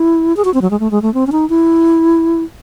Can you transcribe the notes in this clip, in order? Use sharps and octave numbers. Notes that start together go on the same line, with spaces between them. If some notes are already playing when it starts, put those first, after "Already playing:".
Already playing: E4
G#4
F#4
C4
F#3
G#3
A3
G#3
A3
C4
C#4
D#4
E4